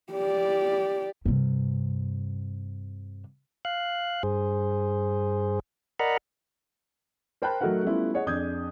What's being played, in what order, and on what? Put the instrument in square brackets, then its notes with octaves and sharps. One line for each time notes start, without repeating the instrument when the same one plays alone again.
[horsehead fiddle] G4 D5
[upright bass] G2 C3
[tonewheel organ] F5 F#6
G2 G#4 C5
A#4 D5 D#5 F#5 A#5 B5
[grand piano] A#4 C5 G5 A5 B5 F#6
F#3 A3 D#4 F#4 A#4 F#5
G3 A3 B3 C#4 E4 F4
G#4 C#5 D#5 F#5
F2 D4 G#4 D#6 G6 G#6